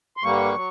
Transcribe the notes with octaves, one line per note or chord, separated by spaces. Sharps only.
C6
G2 D3 G3 A#3 C#6
F#3